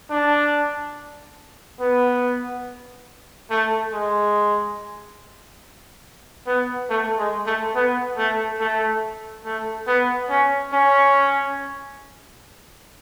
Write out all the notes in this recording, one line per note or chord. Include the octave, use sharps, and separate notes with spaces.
D4
B3
A3
G#3
B3
A3
G#3
A3
B3
A3
A3
A3
B3
C#4
C#4